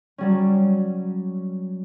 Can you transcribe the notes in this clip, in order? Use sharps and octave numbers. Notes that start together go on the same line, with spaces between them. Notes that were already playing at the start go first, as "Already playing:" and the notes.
F#3 G3 C#4